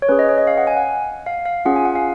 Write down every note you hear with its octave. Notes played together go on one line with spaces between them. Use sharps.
C#5
C#4 G#4 B4
D#5
C#5
D#5
F5
F#5
G#5
F#5
F5
F5
C#4 F4 G#4 F#5
G#5
F#5
F5